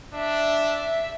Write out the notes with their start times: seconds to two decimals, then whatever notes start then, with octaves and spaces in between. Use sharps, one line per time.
0.14 D4 E5